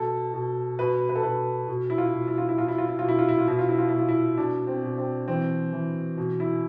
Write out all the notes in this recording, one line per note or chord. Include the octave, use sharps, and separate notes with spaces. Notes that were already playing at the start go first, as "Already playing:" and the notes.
Already playing: B2 A4
B2
B2 B4
B4
A4
B2 B4
B2
E4
F4
B2
E4
F4
E4
B2 F4
E4
F4
E4
B2 F4
E4
F4
E4
F4
B2 E4
F4
E4
F4
B2 E4
F4
E4
B2 D4
C4
B2
C4
E3 C4
E3
B2
E4